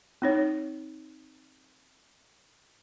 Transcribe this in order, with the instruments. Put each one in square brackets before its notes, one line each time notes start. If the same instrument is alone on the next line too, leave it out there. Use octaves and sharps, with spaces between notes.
[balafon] C4 D#4 C#5